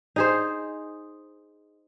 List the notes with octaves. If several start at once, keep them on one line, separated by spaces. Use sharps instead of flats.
D#4 G#4 C5